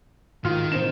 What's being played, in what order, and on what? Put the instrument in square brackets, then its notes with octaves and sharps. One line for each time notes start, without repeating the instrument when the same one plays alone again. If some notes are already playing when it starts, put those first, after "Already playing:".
[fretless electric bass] G#2 [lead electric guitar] D#3 [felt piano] F4 F6
[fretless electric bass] A2 D4 [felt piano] C4 C5 E7